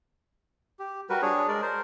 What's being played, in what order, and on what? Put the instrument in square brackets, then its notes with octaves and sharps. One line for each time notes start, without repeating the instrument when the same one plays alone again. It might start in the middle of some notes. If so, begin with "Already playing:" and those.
[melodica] G4
G3 F#4 A#4 B4
D4 G#4 C#5
G#3 A#4 D5
A#4 C5